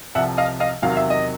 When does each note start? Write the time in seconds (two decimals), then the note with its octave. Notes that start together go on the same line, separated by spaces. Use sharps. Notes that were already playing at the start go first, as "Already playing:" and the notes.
0.15 C2 C3 F3 E5 F#5
0.37 D#5 F5
0.60 D#5 F5
0.82 E2 C3 D#3 F#3 F5
0.97 E5
1.10 D#5